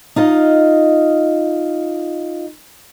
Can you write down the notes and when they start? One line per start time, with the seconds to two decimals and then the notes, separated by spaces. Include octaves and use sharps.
0.16 D#4 F4 D#5